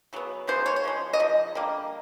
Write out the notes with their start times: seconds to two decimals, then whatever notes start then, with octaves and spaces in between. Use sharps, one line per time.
0.13 C#3 F#3 B3
0.47 C#3 F#3 B3 C5
0.66 C#5
0.76 C#5
0.84 C#3 F3 G#3
1.13 D#5
1.19 C#3 F3
1.55 D3 G3 A#3